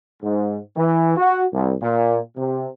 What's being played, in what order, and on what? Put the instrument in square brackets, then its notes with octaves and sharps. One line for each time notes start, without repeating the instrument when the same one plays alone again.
[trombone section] G#2
E3
F#4
C2
A#2
C3